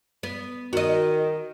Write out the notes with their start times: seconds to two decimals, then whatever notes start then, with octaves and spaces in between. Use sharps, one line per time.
0.23 B3
0.73 D#3 F#4 D#5